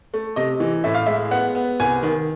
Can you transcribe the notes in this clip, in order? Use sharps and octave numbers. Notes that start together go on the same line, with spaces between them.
A3
C3 D#5
E3
A2 E5
F5
G#3 E5
B3 F#5
B3
C2 G#5
D#3